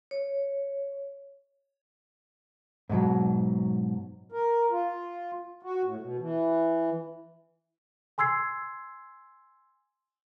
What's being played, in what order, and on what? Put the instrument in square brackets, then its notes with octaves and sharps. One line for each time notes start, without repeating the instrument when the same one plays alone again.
[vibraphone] C#5
[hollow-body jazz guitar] G#2 B2 F3 F#3
[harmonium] A#4
F4
F#4
A2
B2
E3
[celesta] G#5 C6 E6 G#6 C7